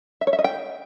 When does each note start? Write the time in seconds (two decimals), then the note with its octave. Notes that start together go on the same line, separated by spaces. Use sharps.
0.21 E5
0.27 C#5
0.33 E5
0.39 D#5
0.44 G5